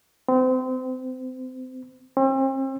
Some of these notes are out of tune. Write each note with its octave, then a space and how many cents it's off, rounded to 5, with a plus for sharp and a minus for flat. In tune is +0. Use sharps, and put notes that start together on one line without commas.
C4 -30
C4 +40